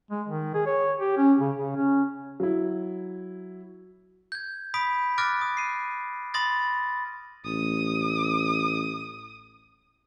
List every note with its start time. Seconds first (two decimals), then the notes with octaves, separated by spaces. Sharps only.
0.11 G#3
0.28 D#3
0.54 G#4
0.66 C#5
0.99 G4
1.17 C#4
1.40 C#3
1.57 C#3
1.76 C#4
2.40 F#3 E4
4.32 G6 G#6
4.74 B5 D#6 B6 D7
5.18 D6 F6 F#6 A6 A#6 D7
5.41 D#6
5.57 C7 D#7
6.34 B5 C6 D#6 A6 A#6
7.45 A1 D#6